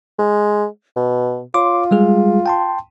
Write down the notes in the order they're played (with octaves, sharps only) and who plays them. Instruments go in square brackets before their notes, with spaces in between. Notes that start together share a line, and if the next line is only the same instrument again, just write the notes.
[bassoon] G#3
B2
[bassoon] F4 [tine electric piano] C#5 C6 D6
[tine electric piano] G3 G#3 G#4
G5 A5 C6